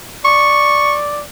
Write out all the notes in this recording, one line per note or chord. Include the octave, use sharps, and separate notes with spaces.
D5 C#6